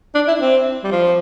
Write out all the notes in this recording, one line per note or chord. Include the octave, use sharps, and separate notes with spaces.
D4
E4
C4
G3
F3